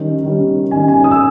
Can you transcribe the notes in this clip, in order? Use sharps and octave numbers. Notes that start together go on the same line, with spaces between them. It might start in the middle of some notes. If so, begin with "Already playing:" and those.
Already playing: D#3 G3 C#4
D#3 G3 C#4
D#3 G3 C#4 G#5
G#5
D#6
E6